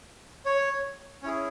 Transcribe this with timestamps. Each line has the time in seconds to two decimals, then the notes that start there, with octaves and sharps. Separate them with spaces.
0.46 C#5
1.23 C#4 E4 G#4 C#5